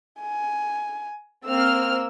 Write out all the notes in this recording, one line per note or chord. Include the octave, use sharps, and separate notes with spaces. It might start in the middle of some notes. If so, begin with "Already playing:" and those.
G#5
A#3 C4 E6 F6